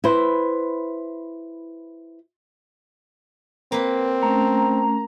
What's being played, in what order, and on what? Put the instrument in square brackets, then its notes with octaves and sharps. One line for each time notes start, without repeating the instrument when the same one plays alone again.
[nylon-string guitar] E4 B4 C5
[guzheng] A#3 B4 [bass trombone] C4
[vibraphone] A3 C#4 [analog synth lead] A#5